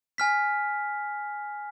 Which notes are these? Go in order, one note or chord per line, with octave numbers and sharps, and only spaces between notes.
G#5 F6 B6